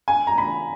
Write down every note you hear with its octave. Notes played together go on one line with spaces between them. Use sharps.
G#5
A#5
B5